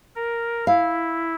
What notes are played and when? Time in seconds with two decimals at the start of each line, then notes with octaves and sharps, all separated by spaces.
0.15 A#4
0.67 E4 F5